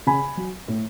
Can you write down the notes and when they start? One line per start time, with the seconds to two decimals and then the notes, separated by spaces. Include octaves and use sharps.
0.07 C#3 G#5 B5
0.37 F#3
0.68 A2